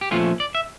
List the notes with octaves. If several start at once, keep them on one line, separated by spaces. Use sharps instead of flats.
G4
A#2 F3 A3 C#4 F4
D5
E5